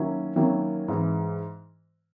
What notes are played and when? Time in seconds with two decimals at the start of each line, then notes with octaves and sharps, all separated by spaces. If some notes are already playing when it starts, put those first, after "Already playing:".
Already playing: D#3 F#3 A#3 C#4 E4
0.36 D#3 F#3 A#3 C#4 E4
0.88 G#2 E3 G#3